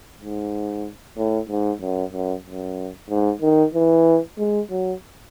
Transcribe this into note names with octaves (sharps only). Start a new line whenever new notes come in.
G#2
A2
G#2
F#2
F#2
F#2
G#2
D#3
E3
G#3
F#3